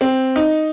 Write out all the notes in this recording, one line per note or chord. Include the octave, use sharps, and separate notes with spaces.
C4
D#4